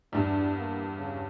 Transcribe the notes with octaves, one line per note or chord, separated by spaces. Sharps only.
E2 G2 D4
A#3
C#3